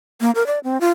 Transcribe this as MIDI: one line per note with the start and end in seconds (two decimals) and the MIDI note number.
0.21 0.31 58
0.35 0.46 70
0.47 0.59 74
0.64 0.80 60
0.81 0.91 65